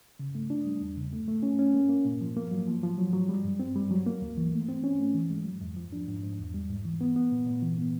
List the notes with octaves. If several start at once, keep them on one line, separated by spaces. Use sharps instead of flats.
C#3
A3
D4
G3
E2
C#3
A3
A3
C#4
C#4
A#3
A#3
A#2
F3
A#3
F#3
F3
F3
F#3
F#3
G3
G2
C4
G3
F#3
A#3
D2
E3
A3
C4
C#4
A3
E3
G#3
F#3
F2
F3
D4
G#2
G#2
E2
G3
G#2
E3
B3
B3
A#2
A#2
E3
B3